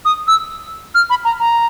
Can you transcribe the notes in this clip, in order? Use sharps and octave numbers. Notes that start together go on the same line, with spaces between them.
D#6
E6
F6
B5
A#5
A#5